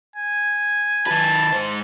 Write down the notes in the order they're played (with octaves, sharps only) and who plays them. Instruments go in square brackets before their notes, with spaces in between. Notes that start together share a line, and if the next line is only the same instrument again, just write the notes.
[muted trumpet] G#5
[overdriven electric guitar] D#3 B4 [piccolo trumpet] A5
[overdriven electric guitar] G#2 C5